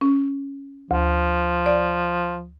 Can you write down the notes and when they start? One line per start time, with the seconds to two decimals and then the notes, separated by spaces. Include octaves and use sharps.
0.01 C#4
0.91 D2 F3
1.66 D5